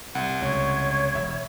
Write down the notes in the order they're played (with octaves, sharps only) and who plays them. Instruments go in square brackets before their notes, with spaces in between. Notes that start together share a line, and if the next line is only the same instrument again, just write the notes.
[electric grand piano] C2 F#5
[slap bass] C#2 [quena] C#5
[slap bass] E1 [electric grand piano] E5